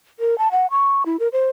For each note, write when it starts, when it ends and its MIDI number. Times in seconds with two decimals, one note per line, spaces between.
0.20 0.37 70
0.38 0.51 81
0.52 0.66 78
0.71 1.03 85
1.06 1.17 64
1.20 1.28 70
1.33 1.48 72